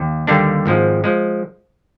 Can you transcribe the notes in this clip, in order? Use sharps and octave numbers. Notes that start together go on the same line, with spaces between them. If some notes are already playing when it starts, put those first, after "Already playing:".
Already playing: D#2
D#2 D3 G3 A#3 D4
G#1 G#2 F3 G#3
F3 G#3